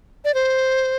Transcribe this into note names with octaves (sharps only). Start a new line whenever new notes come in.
D5
C5